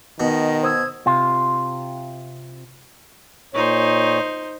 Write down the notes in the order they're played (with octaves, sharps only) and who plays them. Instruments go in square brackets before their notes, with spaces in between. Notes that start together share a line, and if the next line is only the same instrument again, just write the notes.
[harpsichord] B2 [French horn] D#3 [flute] D#5
[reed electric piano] C5 D#6 E6 [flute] G#6
[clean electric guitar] C3 F4
[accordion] A#2 C#5 [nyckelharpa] D#4 C5